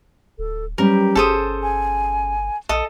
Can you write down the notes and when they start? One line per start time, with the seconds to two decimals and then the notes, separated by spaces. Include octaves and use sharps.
0.38 D1 A4
0.78 F#3 G3 C#4 G4 A#4 B4
1.15 G1 C#4 G#4 A4 C5 D#6
1.62 G#5
2.69 A#1 A4 D#5